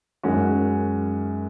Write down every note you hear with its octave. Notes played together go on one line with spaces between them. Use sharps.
F#2 D#3 G#3 C#4 F#4